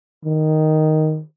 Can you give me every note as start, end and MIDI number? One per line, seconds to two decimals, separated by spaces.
0.25 1.21 51